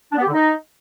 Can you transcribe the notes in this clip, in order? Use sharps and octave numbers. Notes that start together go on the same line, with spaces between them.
D4
B3
G4
D3
D#4